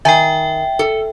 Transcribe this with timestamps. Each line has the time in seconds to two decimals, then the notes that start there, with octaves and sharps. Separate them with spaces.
0.05 D#3 E5 G5 G#5
0.79 A4